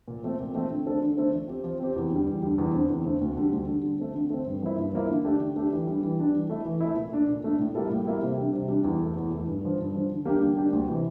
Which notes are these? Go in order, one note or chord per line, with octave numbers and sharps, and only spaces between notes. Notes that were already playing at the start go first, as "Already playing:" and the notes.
A#2
F3 A3 C4
A#2
F3 A3 C4
D3
A3 D4 A4 C5
D3
A3 D4 A4 C5
F3
C4 G4
F3
C4 G4
E2
D3 G3
E2
D3 G3
E2
D3 A3 C4
E2
D3 A3 C4
D2
D3 G3
D2
D3 G3
D3
A3 C4
D3
A3 C4
G2
F3 A#3 E4
G2
F3 A#3 E4
D3
A3 D4 G4
D3
A3 D4 G4
E3
G3 D4 G4
E3
G3 D4 G4
E3
A3 E4
E3
A3 E4
A#2
A3 D4
A#2
A3 D4
A2
G3 A#3 E4 A4
A2
G3 A#3 E4 A4
C3
G3 D4
C3
G3 D4
E2
E3 A3
E2
E3 A3
G2
D3 F3
G2
D3 F3
D3
G3 A#3 D4 G4
D3
G3 A#3 D4 G4
D2
C3 E3